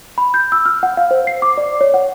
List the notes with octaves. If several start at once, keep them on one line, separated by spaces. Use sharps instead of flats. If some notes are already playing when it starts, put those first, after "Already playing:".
B5
G6
E6
F6
F#5
F5
C5
C7
D6
D5
C#5
F#5